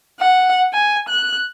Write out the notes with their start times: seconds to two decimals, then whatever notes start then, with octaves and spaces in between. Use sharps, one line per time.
0.20 F#5
0.73 G#5
1.09 F#6